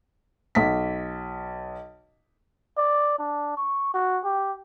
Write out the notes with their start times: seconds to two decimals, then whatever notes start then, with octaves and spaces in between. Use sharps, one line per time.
0.55 B1 B6
2.77 D5
3.19 D4
3.57 C#6
3.94 F#4
4.24 G4